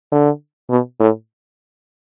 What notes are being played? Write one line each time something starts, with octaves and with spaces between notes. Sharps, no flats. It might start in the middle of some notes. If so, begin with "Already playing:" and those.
D3
B2
A2